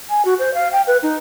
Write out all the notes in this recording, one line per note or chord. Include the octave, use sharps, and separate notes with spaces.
G#5
F#4
C5
F5
G5
B4
D#4